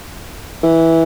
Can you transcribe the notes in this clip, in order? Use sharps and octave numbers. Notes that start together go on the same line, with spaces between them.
E3